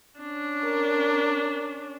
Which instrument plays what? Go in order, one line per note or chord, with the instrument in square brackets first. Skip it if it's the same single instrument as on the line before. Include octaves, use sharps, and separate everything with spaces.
[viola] C#4 D4
[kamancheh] A#4